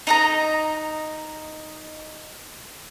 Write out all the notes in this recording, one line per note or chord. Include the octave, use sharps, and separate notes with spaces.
D#4 D#5 A#5